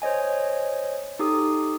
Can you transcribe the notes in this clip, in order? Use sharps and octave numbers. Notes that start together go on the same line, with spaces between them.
C5 C#5 D#5 G#5
D#4 G4 A4 D#6